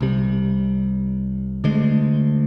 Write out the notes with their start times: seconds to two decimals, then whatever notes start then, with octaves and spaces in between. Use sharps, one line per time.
0.01 C2 C3 G3
1.64 D2 D3 G#3